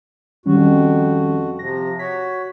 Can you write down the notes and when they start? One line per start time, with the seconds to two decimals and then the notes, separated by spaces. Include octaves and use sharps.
0.46 F2 D#3 G3 C#4 F#4
1.59 C3 F3 A#6
1.99 F#4 C#5 B6